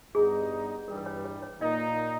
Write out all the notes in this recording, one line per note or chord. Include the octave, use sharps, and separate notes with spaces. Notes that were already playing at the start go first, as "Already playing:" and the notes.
G2 G3 B3 D#4 G#4
G2 E3 G3 A#4
B4
C#5
B4
C#5
C#5
A#2 A#3 D#4 D#5